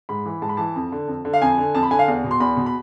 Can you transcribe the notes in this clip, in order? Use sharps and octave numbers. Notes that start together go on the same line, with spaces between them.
G#2 B5
E3
G#2 A5
B5
E3 A5
F2
D3
F2
D3
F5
F2 G#5
D3
F2 A5
B5
D3 G#5
F5
E2
B2
C6
E2 B5
B2
B5